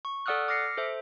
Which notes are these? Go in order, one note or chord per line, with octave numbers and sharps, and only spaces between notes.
C#6
A4 D5 F#5 D#6 F6 F#6
D6 F6 A#6 C7 C#7
A4 C5 E5